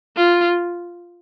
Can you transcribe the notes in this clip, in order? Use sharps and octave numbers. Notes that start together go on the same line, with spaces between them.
F4